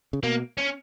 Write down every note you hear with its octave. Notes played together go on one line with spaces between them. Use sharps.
C#3
B2 A#3
C#4